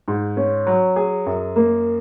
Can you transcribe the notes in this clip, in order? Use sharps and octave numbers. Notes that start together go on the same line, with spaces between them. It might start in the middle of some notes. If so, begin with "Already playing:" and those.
G#2
C#4
F#3
G#4
F#2
A#3